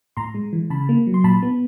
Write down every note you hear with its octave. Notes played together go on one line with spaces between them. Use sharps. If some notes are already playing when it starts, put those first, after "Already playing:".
A2 A#5 C6
G#3
E3
C#3 A5 B5
A#3
F#3
C6
A#2 A5 B5
B3